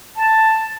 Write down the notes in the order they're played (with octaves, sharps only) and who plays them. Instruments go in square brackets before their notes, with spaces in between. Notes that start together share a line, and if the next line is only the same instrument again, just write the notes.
[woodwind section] A5